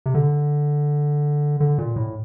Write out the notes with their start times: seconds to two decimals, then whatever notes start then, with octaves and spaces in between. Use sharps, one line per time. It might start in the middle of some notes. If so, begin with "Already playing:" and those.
0.06 C3
0.14 D3
1.60 D3
1.78 A#2
1.96 A2